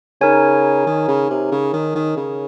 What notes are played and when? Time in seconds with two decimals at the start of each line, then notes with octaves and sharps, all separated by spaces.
0.21 C#3 D#4 A#4 C#5 G#5
0.86 D#3
1.08 C#3
1.30 C3
1.52 C#3
1.73 D#3
1.95 D#3
2.17 C#3